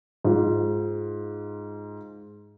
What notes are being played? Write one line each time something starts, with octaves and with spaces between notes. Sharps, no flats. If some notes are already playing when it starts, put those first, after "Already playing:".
G#2 F4